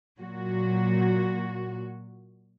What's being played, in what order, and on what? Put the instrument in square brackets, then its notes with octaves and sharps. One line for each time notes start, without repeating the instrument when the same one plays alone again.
[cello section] A#2 F#3 F#4